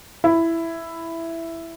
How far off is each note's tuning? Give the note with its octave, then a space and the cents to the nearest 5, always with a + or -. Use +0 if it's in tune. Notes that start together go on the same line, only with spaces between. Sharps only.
E4 +5